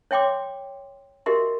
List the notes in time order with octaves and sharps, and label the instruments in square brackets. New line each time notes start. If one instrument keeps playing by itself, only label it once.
[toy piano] C#5 E5 G5 C6 D6
F#4 G4 A#4 D#5 E5 C6